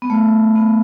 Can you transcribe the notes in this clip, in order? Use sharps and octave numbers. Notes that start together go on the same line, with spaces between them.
B3
A3
B3